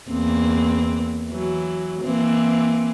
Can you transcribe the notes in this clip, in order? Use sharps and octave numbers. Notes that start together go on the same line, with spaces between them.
E2 A#3 C4
E3 F#3
E3 A#3 C4